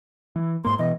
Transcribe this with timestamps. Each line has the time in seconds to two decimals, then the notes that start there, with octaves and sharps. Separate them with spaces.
0.36 E3
0.64 G#2 A#3 C6
0.79 B2 E3 D#5